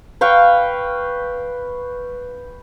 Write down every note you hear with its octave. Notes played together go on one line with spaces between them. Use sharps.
B4 F5 G5 C#6